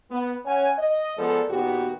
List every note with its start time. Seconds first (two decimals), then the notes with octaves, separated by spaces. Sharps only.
0.11 B3
0.46 C#4 C#5 F#5 G#5
0.78 D#5
1.18 F3 G#3 B3 A4 A#4 D5
1.50 A#2 D#3 B3 F#4 G4